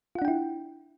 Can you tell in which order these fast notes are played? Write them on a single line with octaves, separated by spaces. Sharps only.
F4 F#5 D4 G5 E4